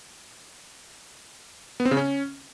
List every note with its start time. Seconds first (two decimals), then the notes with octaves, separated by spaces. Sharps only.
1.80 B3
1.85 C4
1.91 C#3
1.97 C#4